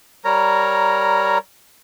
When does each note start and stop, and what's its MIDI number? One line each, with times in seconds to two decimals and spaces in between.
0.25 1.38 55
0.25 1.38 70
0.25 1.38 73
0.25 1.38 82